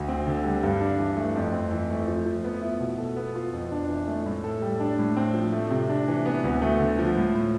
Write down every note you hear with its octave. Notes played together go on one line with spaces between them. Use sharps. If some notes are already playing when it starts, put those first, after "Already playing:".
Already playing: D2
C4
D3
G3
G2
D4
E3
A3
F2
C4
E3
A3
F3
F3
B3
E4
B2
A4
B3
F4
F2
D4
E3
A3
A2
A4
G3
D4
A2
C4
F3
A3
C3
D4
E3
B3
D2
A3
D3
F3
A2
A2